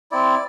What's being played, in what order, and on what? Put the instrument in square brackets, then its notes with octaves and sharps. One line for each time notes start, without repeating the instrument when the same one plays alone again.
[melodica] C4 E4 D5